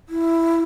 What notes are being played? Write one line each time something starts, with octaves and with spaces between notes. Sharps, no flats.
E4